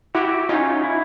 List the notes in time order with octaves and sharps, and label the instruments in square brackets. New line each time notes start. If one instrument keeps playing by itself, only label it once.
[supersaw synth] E4 F#4 [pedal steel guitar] G4
[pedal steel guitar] C#4 [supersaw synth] D#4 F4
[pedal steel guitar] E4